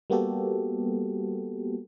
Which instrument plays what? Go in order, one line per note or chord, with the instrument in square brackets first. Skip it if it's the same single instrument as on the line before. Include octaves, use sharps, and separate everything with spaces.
[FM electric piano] G3 A#3 B3 F#4 G4 A4